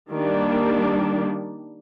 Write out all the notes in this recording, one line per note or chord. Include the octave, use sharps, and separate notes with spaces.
D#3 G3 A#3 D4